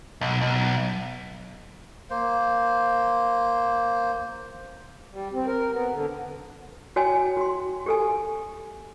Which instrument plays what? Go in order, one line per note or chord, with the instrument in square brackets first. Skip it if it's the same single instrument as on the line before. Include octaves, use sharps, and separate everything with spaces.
[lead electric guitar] B1
B1
[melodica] A#3 C5
[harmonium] G3
C4
A#4
B3
D3
[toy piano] F#4 C#5 G5 G#5
F#4 C6
G4 A4 G#5